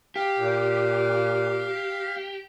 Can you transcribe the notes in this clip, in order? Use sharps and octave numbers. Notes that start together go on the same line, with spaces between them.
G4 F5
A#2